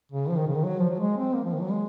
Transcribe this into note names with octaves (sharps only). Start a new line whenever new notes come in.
C#3
F3
D#3
C#3
D#3
F#3
F3
F#3
G#3
C4
A#3
F3
D#3
F#3
G#3